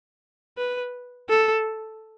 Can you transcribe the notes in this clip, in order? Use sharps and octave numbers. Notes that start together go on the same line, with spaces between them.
B4
A4